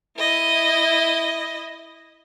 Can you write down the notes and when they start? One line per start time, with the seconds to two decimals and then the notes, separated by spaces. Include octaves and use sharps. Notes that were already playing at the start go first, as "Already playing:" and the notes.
0.18 E4 D#5